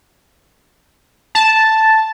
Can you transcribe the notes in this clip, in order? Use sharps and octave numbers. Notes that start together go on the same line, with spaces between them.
A5